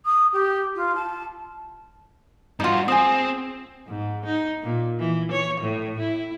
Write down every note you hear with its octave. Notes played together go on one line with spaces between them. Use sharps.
D#6
G4
F4
A5
G2 D#4 F4 F#4
C4 G#4 D#6
G#2
D#4
A#2
E3
C#5
A2
E4